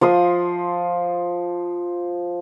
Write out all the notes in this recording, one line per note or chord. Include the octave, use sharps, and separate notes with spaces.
F3 C6 D#6